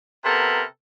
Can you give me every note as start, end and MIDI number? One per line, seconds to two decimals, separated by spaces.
0.25 0.62 48
0.25 0.62 59
0.25 0.62 69
0.25 0.62 70
0.25 0.62 83